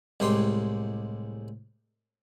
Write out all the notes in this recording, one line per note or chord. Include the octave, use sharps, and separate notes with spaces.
C2 A2 G#3 G4 C6